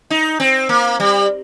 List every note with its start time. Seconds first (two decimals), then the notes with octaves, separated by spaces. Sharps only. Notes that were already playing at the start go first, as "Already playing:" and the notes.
0.10 D#4
0.40 C4
0.69 A#3
1.00 G3